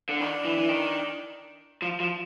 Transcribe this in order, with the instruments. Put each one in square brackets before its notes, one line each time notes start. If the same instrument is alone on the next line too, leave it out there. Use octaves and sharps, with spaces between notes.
[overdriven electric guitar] D3
[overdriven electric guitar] D#3 [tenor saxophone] D4
[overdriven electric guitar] E3
E3
D#3
F3
F3